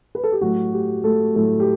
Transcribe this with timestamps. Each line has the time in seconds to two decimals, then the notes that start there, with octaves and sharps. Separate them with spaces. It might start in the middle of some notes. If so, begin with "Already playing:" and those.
0.15 B4
0.24 A4
0.32 G4
0.41 A2 F#3 A3 F#4
0.73 G4
1.04 A3 A4
1.35 A2 F#3 A3 A4
1.60 G4